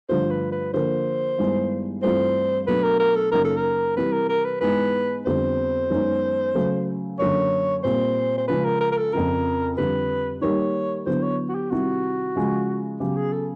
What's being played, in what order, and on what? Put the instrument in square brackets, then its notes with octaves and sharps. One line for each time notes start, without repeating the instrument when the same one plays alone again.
[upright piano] G2 D3 F3 A3 [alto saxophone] C5
[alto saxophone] B4
B4
[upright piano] D3 F3 A#3 [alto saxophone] C5
[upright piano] G2 D#3 G#3 B3 E4
[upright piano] G2 E3 A3 C4 F4 [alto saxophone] C5
[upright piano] B2 F#3 A3 D4 [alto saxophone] B4
[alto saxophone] A#4
A#4
A4
[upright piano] F#2 C#3 F#3 A#3 D#4 [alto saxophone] A#4
[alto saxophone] A4
A#4
[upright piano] C3 E3 G3 [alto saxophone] B4
[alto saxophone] A#4
A#4
B4
[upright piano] G#2 E3 G#3 B3 D#4 [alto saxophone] B4
[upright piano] F2 D3 G3 B3 [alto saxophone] C5
[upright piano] F#2 D#3 G#3 B3 D#4
C#3 F#3 A3
[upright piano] F#2 D3 F#3 A#3 [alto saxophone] C#5
[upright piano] A#2 G3 C4 [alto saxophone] C5
[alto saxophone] C5
[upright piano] C#3 F3 G#3 C#4 [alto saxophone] B4
[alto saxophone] A#4
A#4
A#4
A4
[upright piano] F2 C#3 F3 [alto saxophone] A#4
[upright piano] F2 D3 G3 [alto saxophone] B4
[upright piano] D#3 G3 A#3 D#4 [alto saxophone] C#5
[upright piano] D3 F#3 B3 E4 [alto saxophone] C5
[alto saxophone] C#5
F#4
G4
[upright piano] C3 D#3 G3 C4 E4 [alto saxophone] F#4
[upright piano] C#3 F3 G#3
[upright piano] C#3 F#3 B3 [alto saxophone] G4
[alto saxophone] G#4
A4